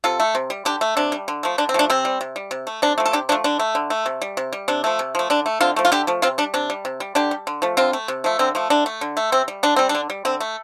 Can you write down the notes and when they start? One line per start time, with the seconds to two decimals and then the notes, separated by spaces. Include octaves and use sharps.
0.04 C3 F4 A4
0.20 A3
0.35 C3
0.50 G3
0.65 D3 D4 G4
0.81 A3
0.97 C3 D4
1.12 G3
1.28 D3
1.43 F3 A3
1.58 D3 D4
1.69 C4
1.74 F3 A3 D4
1.90 C3 C4
2.05 G3
2.21 C3
2.36 G3
2.51 C3
2.67 A3
2.82 C3 D4
2.98 F3 A3
3.05 A4
3.13 C3 D4 G4
3.29 F3 D4
3.32 A3
3.44 D3 D4
3.59 A3
3.75 D3
3.90 A3
4.06 C3
4.22 G3
4.37 C3
4.53 G3
4.68 C3 D4
4.84 F3 A3
4.99 C3
5.15 F3 A3
5.30 D3 D4
5.46 A3
5.61 D3 C4 F4
5.76 F3 A3
5.85 F4
5.92 D3 D4 G4
6.07 F3 A3
6.22 C3 C4 F4
6.38 G3 D4
6.54 C3 D4
6.70 G3
6.85 C3
7.00 G3
7.15 D3 D4 G4
7.31 G3
7.47 D3
7.62 F3 A3
7.77 D3 C4 F4
7.93 A3
8.08 C3
8.24 F3 A3
8.39 D3 C4
8.55 F3 A3
8.70 D3 D4
8.86 A3
9.01 D3
9.17 A3
9.32 C3 C4
9.48 G3
9.63 D3 D4
9.76 G3 C4
9.89 D4
9.95 D3
10.10 G3
10.25 D3 C4
10.40 A3